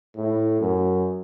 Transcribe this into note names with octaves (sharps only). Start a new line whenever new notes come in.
A2
F#2